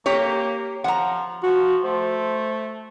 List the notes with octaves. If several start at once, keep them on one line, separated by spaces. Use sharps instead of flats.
A#3 G4 C#5
F3 F#5 A#5
F3 F#4
A3 C5